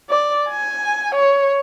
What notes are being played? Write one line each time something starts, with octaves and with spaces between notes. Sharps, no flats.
D5
G#5
C#5